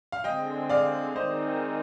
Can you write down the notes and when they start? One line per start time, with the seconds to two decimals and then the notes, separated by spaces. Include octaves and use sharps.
0.12 F5
0.24 D3 G#3 C4 D#5 G5
0.69 D5 F5
1.16 D#3 G#3 C4 D#4 C5 D#5